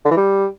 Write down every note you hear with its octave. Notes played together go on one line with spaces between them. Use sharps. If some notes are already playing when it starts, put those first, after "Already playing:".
D3
E3
G3